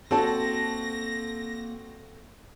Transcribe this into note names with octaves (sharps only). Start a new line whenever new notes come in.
A#3 C4 F#4 A4 A5 A#6